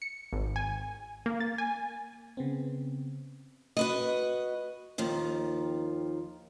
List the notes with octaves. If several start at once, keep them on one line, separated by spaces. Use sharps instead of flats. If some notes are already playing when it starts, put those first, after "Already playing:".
C#7
G#1
G#5
A#3
A6
G#5
C#3 B3 C4
F#4 B4 D#5
D#2 D#3 F3